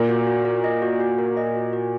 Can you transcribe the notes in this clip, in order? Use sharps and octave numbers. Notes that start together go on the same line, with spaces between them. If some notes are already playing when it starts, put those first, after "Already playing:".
Already playing: A#2 A#3
F#4
F#4
A#4
D#5
F#4
F#4
A#4
D#5
F#4
F#4